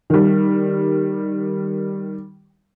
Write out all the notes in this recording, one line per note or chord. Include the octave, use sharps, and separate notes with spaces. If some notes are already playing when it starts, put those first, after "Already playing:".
D#3 G3